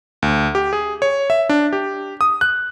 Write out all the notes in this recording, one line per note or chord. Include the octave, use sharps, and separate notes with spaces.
D2
G4
G#4
C#5
E5
D4
G4
D#6
F#6